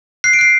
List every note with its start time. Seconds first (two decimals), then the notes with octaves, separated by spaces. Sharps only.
0.24 F#6 C7
0.33 D7
0.39 F#6 C7